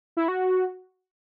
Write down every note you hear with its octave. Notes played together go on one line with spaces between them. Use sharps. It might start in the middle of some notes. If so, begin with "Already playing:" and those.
E4
F#4